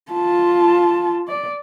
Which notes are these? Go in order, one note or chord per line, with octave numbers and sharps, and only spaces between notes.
F4 A5
D5